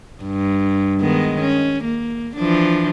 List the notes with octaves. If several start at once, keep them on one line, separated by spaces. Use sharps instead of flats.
G2
D#3 G#3 B3
C#4
A#3
E3 F3 D4